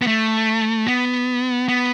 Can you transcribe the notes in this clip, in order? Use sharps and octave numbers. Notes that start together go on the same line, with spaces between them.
B3
A3
B3
B3